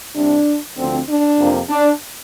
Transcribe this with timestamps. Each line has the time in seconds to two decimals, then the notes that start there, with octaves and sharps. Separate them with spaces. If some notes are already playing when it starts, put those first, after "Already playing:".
0.16 C2 C3 G3 D4
0.77 D2 D3 F3 C4
1.07 D4
1.38 F2 C3 F3 A#3
1.69 D4